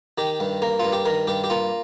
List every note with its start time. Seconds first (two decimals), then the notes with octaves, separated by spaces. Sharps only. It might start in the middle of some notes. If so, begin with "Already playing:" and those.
0.18 D#3 G4
0.40 G2
0.62 A#3 A#4
0.79 F4
0.85 G2
0.93 G4
1.06 D#3 A#4
1.27 G2 G4
1.44 G4
1.50 A#3 F4